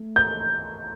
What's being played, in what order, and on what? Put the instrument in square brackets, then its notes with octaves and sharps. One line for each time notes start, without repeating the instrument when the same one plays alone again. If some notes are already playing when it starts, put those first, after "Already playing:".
Already playing: [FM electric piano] A3
[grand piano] G6